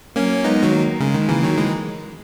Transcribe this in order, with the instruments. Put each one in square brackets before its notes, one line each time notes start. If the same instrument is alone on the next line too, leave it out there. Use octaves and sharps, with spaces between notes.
[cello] F#3 [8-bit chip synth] A#3 C#4
[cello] G#3 [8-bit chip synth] B3 D#4
[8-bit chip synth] D#3 F#3
[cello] A#3
[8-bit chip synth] C#3 [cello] G#3
[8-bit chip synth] D#3
[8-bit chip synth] C#3 E3 [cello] A#3
[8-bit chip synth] D#3 F#3
E3 G#3